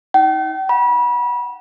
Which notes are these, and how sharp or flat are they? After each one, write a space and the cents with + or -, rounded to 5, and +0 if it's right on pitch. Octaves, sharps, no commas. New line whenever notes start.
D#4 +30 G5 -40
F#5 -10 B5 -30